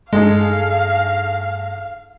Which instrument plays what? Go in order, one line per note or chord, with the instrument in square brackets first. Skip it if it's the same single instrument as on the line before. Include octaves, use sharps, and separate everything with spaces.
[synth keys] G2 A3 A#6 [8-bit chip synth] G#3 [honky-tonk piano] D#4 G#4 A4 [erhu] F5